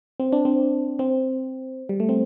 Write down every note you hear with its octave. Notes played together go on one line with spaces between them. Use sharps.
C4
D4
C4
C4
G3
A3
C4